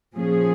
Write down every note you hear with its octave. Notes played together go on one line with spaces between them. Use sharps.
A#2 F3 C#4 G#4